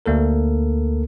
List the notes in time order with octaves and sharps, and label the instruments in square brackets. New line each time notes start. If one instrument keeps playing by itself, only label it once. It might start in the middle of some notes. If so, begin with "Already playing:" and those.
[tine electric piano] D2 A#3 A4 A#4